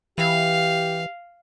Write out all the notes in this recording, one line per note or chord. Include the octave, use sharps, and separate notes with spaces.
E3 G4 F5